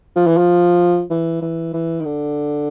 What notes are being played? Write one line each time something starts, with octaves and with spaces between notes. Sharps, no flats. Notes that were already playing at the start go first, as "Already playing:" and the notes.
F3
E3
F3
E3
E3
E3
D#3
D3